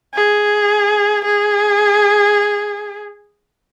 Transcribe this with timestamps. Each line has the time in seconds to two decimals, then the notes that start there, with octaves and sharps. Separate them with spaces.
0.14 G#4
1.25 G#4